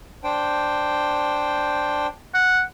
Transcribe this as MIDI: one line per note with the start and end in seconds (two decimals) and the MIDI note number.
0.24 2.07 62
0.24 2.07 72
0.24 2.07 79
2.34 2.62 78